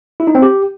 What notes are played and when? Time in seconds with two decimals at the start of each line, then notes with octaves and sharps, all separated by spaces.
0.20 E4
0.27 D#4
0.35 C4
0.42 G4